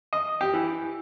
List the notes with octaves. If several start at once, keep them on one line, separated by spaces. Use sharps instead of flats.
D#5
G4
E3